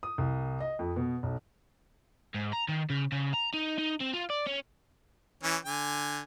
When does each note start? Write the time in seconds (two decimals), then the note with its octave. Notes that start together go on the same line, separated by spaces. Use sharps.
0.03 D#6
0.18 C2
0.60 D#5
0.79 F2
0.96 B2
1.23 B1
2.34 G#2
2.53 A#5
2.68 D#3
2.90 C#3
3.12 C#3
3.34 A#5
3.54 D#4
3.78 D#4
4.00 C4
4.13 F4
4.30 D5
4.47 C#4
5.43 E3 C#4
5.65 D3 G#5